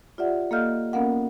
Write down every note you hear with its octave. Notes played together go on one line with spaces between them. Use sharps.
F4 G4 D5 E5 F#5
A#3 A4 D#5 F5 F6 G6
A#3 B3 C#4 A#4 F5 F#5